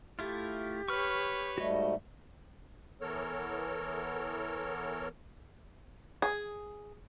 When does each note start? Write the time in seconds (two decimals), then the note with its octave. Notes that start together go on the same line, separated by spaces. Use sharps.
0.19 A3 E4 F4 G4
0.88 B4 C#5 C#6 F6
1.58 G#2 G3 A3 F#4 D#5
3.01 E3 B3 A4 A#4 C#5
6.22 G#4